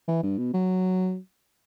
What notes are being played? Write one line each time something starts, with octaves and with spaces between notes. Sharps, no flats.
E3
G2
B2
F#3